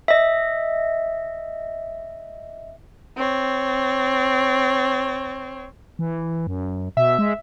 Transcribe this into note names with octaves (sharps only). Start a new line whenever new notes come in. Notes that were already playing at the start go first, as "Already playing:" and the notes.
D#5 E5
C4 C#5
E3
F#2
B2 E5
G#3